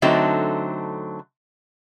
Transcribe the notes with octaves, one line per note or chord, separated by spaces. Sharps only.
D3 F#3 A3 C4 D#4